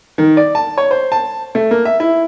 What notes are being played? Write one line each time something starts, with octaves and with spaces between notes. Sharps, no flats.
D#3
D5
A5
C#5
C5
A5
A3
A#3
E5
E4